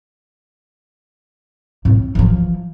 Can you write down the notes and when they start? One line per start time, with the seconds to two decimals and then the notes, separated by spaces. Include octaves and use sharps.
1.85 A2 C4
2.15 E3 F3